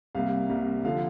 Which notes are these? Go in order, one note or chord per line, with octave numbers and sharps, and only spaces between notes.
C2 C3 G3 A#3 F5
C2 C3 G3 A#3
D3 F3 F5